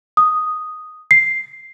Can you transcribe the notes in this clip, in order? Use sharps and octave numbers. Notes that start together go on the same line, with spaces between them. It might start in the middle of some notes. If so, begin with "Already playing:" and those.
D#6
C7